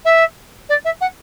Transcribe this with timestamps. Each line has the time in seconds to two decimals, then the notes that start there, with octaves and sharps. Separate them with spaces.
0.05 E5
0.69 D5
0.85 E5
1.01 F#5